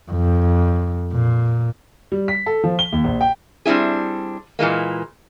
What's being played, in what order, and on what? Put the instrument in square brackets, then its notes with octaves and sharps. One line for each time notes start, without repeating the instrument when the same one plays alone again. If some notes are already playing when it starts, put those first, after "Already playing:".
[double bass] F2
A#2
[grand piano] G3
B6
A4
F3
G7
D#2
A#1
G5
[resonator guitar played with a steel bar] G3 C4 D4 E4 G#4
A#2 E3 G#3 A#3